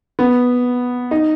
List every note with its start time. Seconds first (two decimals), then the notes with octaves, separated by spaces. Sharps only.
0.19 B3
1.11 D#4